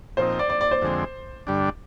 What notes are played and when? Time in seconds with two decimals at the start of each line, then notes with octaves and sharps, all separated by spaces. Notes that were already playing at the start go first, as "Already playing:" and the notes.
0.17 A#2 F3 C4 D#4 C5
0.39 D5
0.50 D5
0.61 D5
0.71 C5
0.82 F2 D3 G#3 C4
1.47 G2 D3 G3 D4